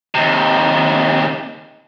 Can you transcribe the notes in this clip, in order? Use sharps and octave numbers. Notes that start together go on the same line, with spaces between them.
D#2 C3